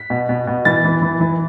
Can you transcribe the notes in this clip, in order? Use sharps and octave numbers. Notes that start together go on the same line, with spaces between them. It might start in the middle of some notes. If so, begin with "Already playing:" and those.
Already playing: B6
B2
B2
B2
E3 A6
E3
E3
E3